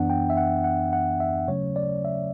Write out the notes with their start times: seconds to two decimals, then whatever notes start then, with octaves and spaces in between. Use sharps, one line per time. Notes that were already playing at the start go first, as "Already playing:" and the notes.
Already playing: F#2 E3 B3 D4 F#5
0.10 G5
0.30 E5
0.37 F#5
0.64 F#5
0.93 F#5
1.20 E5
1.48 C#3 F#3 A3 C#4 C#5
1.76 D5
2.05 E5